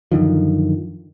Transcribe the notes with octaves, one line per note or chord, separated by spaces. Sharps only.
F#2 D3 D#3 F3